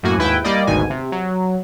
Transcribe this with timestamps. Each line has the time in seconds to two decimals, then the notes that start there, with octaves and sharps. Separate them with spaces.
0.03 F#2 A2 A#3 F#4 G#5
0.18 D#2 G#2 E4 B4 G5
0.44 G3 A#3 D5 D#5
0.67 G#1 D2 G#2 B2 G#5
0.90 C3
1.12 F#3